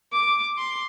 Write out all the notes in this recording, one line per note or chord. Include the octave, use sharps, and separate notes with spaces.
D6
C6